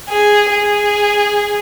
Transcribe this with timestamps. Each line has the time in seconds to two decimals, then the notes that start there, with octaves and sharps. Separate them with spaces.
0.10 G#4
0.51 G#4